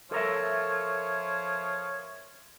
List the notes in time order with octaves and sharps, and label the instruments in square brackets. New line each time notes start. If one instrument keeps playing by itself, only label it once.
[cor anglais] F3 [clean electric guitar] A4 A#4 E5 [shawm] C#5